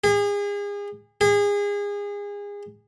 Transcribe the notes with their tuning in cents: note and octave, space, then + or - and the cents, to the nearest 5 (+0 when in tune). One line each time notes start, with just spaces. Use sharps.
G#4 -35
G#4 -30